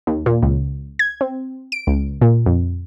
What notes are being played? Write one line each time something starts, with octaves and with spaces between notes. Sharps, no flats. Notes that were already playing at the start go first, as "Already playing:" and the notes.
D#2
A#2
C#2
G#6
C4
D7
C#2
A#2
F2